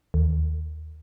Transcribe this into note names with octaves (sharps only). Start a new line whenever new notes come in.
D#2